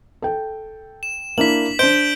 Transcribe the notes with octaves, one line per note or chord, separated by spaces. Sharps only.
A4 G5
E7
A#3 D4 E4 B6 F#7
D4 C5 G6 D7 G7